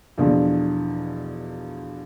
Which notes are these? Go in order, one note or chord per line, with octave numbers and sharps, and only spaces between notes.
E2 B2 D3 F3